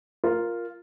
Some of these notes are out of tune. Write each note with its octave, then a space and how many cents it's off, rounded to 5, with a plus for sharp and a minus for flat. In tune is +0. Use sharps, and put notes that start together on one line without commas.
F4 +0 A#4 +0